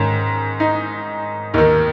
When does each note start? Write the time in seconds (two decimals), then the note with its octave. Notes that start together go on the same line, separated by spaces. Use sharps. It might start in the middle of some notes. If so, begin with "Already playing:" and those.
Already playing: G#2 D#3 C#4
0.60 D#4
1.54 D#2 D#3 D#4